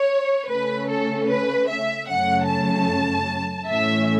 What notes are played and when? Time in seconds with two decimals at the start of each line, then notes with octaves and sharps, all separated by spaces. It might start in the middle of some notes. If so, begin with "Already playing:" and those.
Already playing: C#5
0.49 C#3 A3 C#4 B4
0.89 A4
1.29 B4
1.68 E5
2.08 F#2 C#3 F#3 A3 C#4 F#5
2.48 A5
3.68 A2 E3 A3 C#4 E5